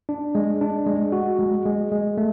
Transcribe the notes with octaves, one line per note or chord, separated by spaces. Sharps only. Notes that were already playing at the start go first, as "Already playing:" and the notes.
D4
G#3
D4
G#3
F#4
G#3
G#3
G#3
A3